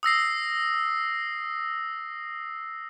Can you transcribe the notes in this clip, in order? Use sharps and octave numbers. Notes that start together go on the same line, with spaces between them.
D#6 E6 A#6 C7